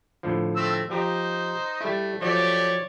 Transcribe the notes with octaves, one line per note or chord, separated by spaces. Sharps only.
A2 D3 F3
A3 C4 E6
F3 D#4 G4 C5 A#5
G3 A3 E4
F3 F#3 A3 G4 C#5 D5